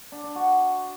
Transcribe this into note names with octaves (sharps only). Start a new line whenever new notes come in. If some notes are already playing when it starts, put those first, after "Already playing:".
D4
D4
F#4